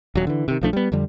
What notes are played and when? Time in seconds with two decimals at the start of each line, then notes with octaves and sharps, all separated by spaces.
0.15 D#1 F#3
0.27 D3 E3
0.48 C3 D#3
0.61 B1 F3 A3 D4
0.73 G3 B3
0.92 F2 D3 G3